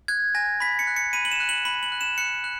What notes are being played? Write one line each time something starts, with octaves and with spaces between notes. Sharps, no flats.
F#6 G#6
G#5 A#6
B5 B6
C#7
F#6
C#7
B5 D#7
F#7
E7
F#6
F#7
B5 F#7
F#7
F#6
E7
F#6 C#7
F#6